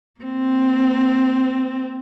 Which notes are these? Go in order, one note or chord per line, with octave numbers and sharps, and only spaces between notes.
A#3 C4